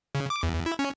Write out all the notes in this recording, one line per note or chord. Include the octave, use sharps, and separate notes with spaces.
C#3
D6
E2
E4
C#4